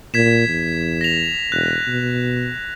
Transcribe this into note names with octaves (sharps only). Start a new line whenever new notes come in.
A#2 G#6 B6 E7
E2
A#6 F7
E1 F#6
B2